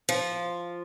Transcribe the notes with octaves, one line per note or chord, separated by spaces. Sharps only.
F3